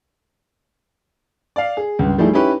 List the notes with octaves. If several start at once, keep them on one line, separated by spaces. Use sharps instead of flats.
D5 F5
G#4
C#2 G2
F3 G3 A3 D#4 E4 G#4
C#4 D#4 E4 G4 B4 C#5